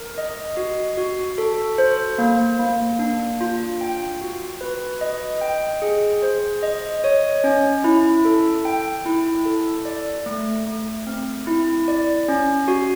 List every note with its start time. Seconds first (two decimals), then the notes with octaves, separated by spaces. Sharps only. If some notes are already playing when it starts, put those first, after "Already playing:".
Already playing: A#4
0.18 D#5
0.57 F#4
0.97 F#4
1.38 A4
1.78 C5
2.18 A#3
2.59 A#3
2.99 D4
3.41 F4
3.81 G5
4.21 F#4
4.61 B4
5.01 D#5
5.41 G5
5.82 G#4
6.22 C5
6.63 D#5
7.04 C#5
7.44 C#4
7.84 E4
8.25 A4
8.65 G5
9.06 E4
9.45 A4
9.85 D5
10.26 A3
10.66 A3
11.07 C4
11.47 E4
11.88 D5
12.28 C#4
12.68 F#4